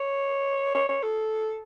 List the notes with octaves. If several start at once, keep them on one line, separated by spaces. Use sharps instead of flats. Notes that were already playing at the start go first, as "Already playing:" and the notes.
Already playing: C#5
C#5
C#5
A4